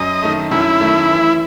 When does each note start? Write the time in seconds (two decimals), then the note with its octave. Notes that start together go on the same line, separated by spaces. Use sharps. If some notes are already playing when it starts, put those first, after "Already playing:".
Already playing: F#2 D#5
0.22 D#3 A3
0.51 F#2 E4
0.81 D#3 A3
1.10 E3